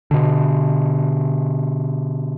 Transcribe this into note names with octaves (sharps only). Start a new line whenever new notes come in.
B2 D3